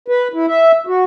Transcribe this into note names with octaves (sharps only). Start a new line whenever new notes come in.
B4
E4
E5
F#4